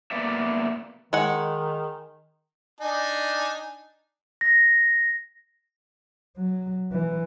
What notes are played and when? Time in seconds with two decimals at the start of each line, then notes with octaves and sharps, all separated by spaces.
0.11 A#3 B3 D5 E5
1.13 D#3 G#3 F#5
2.81 D4 D#4 G#5
4.41 A#6
6.37 F#3
6.92 E3